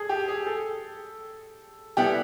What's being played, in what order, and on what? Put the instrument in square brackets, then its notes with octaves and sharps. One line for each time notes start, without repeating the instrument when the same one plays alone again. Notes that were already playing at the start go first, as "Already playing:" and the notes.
Already playing: [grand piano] G#4 A4
G4
G#4
A4
[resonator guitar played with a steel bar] G3 B3 E4 A4 [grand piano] G4